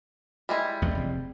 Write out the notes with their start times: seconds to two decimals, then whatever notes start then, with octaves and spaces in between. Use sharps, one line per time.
0.49 G3 G#3 E4
0.82 A1 E2 A3
0.95 F1 C4